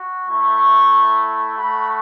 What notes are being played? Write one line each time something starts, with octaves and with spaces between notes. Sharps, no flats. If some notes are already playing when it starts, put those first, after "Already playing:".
Already playing: F#4
A3 E4 C#6
A3 F#4 B5